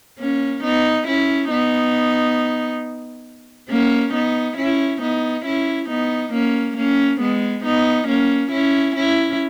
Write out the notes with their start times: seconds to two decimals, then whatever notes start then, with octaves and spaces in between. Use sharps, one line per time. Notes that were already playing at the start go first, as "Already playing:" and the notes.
0.19 A#3 C#4
0.63 B3 D#4
1.07 C#4 E4
1.50 B3 D#4
3.69 A#3 C#4
4.13 B3 D#4
4.57 C#4 E4
5.01 B3 D#4
5.45 C#4 E4
5.89 B3 D#4
6.33 A#3 C#4
6.77 A#3 C#4
7.20 G#3 B3
7.65 B3 D#4
8.08 A#3 C#4
8.52 C#4 E4
8.96 C#4 E4